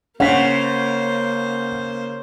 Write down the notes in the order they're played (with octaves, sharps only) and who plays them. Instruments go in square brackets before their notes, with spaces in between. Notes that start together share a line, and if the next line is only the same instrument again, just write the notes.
[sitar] C#3 [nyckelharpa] A#3 C5 [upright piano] C#4 B6 [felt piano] F#5